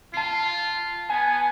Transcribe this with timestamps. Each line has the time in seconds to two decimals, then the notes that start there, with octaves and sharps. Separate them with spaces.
0.14 F4 A5 C7
1.10 B3 G#5